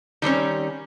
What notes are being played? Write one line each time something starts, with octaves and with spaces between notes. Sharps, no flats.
D#3 G3 C4 C#4